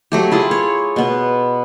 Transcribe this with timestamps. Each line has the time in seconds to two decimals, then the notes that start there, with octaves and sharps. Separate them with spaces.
0.12 F#3 A3 G4
0.31 E4 F4 G#4
0.51 C#5
0.96 B2 B3